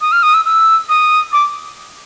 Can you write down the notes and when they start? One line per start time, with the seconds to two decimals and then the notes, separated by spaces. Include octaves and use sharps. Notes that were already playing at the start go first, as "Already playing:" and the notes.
0.01 D#6
0.12 F6
0.23 D#6
0.34 E6
0.45 E6
0.89 D#6
1.33 D6